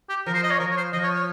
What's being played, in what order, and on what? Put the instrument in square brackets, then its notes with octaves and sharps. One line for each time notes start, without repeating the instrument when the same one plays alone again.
[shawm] G4
[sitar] F3 [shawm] A#4
[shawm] C5
D#5
C#5
[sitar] F3 [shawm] A#4
[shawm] C#5
C5
[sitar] F3 [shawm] D#5
[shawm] C#5
C#5